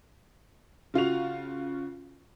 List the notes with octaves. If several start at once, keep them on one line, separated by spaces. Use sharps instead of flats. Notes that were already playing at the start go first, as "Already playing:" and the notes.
C#3 F4 F#4 F7